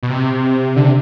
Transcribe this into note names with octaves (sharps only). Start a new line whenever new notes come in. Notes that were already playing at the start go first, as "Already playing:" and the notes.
B2
C3
D3
C3